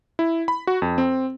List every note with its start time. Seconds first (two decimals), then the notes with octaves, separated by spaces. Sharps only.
0.19 E4
0.48 B5
0.67 F#4
0.82 F2
0.98 C4